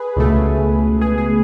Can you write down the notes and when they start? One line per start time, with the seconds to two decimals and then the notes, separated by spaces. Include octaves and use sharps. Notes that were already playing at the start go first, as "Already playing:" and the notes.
Already playing: G#4 B4
0.16 C#2 B2 A3
1.01 G#4
1.18 G#4